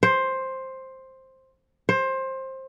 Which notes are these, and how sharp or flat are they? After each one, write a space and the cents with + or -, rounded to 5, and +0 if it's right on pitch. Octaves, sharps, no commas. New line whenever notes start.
C5 +10
C5 +20